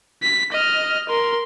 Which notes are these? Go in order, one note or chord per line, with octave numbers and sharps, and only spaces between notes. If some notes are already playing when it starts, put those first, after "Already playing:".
B6
D#5 F6
A#4 C6